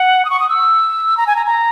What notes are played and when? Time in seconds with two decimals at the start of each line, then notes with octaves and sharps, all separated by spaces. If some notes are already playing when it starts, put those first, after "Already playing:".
Already playing: F#5
0.25 D#6
0.30 C#6
0.40 D#6
0.49 E6
1.17 A#5
1.27 G#5
1.36 A#5
1.46 A#5